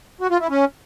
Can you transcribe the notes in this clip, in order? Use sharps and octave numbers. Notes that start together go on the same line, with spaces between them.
F#4
F4
E4
C#4